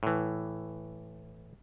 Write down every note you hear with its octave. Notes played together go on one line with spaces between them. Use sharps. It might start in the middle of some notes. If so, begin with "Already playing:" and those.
A2 E3